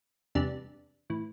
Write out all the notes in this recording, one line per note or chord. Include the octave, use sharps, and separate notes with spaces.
E2 C3 G3 D4
A2 E3